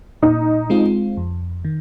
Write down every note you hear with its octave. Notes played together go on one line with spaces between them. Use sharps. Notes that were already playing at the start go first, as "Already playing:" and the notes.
A#2 D#4
G#3 C4 F4
F2
D#3